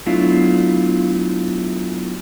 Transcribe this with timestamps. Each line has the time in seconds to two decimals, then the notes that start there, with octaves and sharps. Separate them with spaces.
0.06 F#3 A3 B3 D4 E4 F4